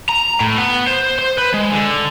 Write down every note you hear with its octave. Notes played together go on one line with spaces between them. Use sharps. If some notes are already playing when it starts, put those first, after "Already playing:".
A#5
A2
B3
C5
C5
B4
G#3
D3